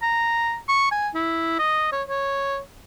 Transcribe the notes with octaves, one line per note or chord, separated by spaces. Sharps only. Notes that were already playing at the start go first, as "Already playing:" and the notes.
A#5
C#6
G#5
E4
D#5
C#5
C#5